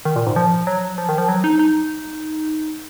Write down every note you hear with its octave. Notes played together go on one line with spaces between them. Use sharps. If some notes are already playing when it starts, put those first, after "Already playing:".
D#3
A#2
G#2
F3
F#3
F3
D#3
F3
F#3
D#4
D#4